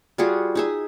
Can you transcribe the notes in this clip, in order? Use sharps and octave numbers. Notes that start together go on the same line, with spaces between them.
G3 F4 F#4 G#4
D#4 G#4 E5